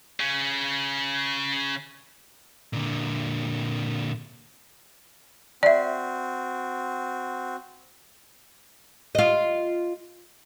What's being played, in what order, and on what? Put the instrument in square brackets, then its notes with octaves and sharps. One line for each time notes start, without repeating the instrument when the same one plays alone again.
[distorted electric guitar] C#3 C#4
[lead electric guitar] A#2 D3
[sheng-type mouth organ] C4 F#4 [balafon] D5 E5
[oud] F4 D#5